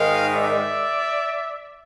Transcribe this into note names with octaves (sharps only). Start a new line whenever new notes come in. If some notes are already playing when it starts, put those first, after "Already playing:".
Already playing: G#2 D#3 G#3 D#5 F5
D5 E5